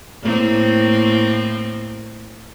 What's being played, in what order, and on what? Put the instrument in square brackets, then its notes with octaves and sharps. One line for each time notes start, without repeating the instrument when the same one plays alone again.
[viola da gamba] A2 A#3 C4